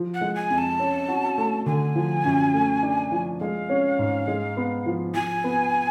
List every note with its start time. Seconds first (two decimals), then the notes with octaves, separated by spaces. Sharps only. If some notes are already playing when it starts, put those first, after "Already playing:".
Already playing: F3
0.14 F#5
0.21 G#3
0.35 G#5
0.50 F2
0.58 A5
0.80 C#4
1.08 F#4
1.38 A3
1.66 D3 G#5
1.95 F3
2.25 F#2
2.54 A3
2.83 D4
3.12 F3
3.40 G#3 F5
3.69 C#4
3.99 G#2
4.28 G#3
4.57 B3
4.86 F3
5.14 F3 G#5
5.44 B3